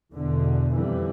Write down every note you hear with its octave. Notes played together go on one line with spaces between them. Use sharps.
E2 B2 D3
F2 C3 E3 G3